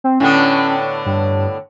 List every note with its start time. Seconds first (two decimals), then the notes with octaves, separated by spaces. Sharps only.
0.04 C4
0.20 A2 D3 B3 C#4
1.06 G2